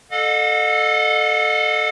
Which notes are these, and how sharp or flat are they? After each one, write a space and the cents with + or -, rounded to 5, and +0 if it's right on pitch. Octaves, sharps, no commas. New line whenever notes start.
A4 +0 D#5 -30 F#5 -45